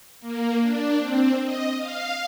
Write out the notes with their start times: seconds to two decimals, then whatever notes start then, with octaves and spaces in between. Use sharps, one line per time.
0.21 A#3
0.61 D4
0.99 C4
1.42 D#5
1.78 F5